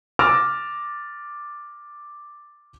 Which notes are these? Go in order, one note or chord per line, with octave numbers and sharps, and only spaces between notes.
D6 E6 F6 A6 A#6 D7